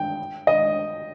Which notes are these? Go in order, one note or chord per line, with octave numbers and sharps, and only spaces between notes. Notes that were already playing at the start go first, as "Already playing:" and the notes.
Already playing: G5
D#5